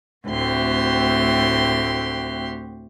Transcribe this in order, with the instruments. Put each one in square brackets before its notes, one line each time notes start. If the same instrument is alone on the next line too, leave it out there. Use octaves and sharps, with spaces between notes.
[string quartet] D2 A2 C4 F#4 G4 C6